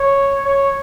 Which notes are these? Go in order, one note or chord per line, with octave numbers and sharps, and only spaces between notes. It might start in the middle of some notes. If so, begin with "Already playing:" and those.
Already playing: C#5
C#5